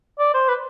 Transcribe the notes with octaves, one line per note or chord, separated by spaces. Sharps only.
D5
C5
B4